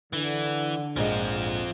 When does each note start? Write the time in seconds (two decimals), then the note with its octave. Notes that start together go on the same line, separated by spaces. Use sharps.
0.13 D3 E3
0.96 A#1 G#2 F3 C4 D#5